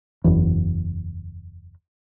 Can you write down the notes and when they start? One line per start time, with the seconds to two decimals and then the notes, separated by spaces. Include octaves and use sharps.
0.24 F#1 E2